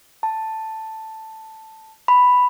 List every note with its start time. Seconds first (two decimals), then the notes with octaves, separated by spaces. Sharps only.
0.23 A5
2.08 B5